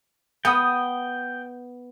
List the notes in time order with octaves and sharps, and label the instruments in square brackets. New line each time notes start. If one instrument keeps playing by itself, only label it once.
[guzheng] B3 [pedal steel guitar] G5 D#6